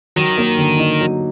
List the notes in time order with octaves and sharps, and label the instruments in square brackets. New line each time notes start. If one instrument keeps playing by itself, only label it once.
[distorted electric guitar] D#3 [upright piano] F#3
[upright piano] A#3
D3
D#4
F#3